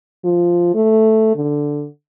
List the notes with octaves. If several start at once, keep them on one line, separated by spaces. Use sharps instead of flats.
F3
A3
D3